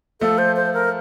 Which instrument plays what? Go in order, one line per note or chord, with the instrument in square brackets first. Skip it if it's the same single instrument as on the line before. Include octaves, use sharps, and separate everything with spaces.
[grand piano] F3 A3 [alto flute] A4
[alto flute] C5
C5
A#4